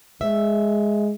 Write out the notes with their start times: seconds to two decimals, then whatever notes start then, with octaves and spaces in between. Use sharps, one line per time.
0.21 G#3 E5